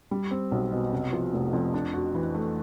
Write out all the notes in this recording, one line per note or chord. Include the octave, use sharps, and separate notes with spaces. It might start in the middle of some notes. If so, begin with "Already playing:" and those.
G3
C4
B1
B2
C3
F3
F1
F2
D4
F#4
E3
A3